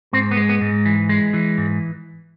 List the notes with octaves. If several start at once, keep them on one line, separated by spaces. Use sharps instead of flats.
G#2 C4
B3
G#3
B3
G#2
E3
G#3
E3
G#2